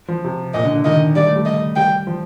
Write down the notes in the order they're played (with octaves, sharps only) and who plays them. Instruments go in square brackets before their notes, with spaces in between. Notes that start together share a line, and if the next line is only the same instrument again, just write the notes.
[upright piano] F3
C3
[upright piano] A#2 [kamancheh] D#5
[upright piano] D3
D3
[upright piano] D#3 [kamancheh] D#5
[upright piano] G3 [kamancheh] D5
[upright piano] A3
G3
[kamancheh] D#5
[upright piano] G3 [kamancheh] G5
[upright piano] F3